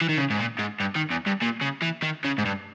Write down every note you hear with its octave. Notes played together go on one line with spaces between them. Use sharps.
E3
D#3
C#3
G#2
A#2
G#2
G2
D#3
E2
G2
A#2
C#3
E3
D#3
C#3
G#2
G2